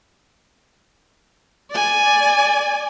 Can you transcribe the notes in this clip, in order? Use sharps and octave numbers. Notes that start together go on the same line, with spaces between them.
D5 G#5